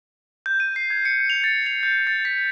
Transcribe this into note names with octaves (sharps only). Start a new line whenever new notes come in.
G6
D#7
C7
G#6
C#7
F7
A6
F7
G6
A6
B6